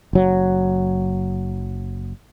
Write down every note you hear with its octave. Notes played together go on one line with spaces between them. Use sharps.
F#1 F#3